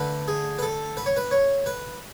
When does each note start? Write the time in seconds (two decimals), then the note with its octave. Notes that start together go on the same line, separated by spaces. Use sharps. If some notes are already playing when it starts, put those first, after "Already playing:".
Already playing: D3 A3 B4
0.28 G#4
0.59 B4
0.62 A4
0.97 B4
1.06 C#5
1.17 B4
1.31 C#5
1.66 B4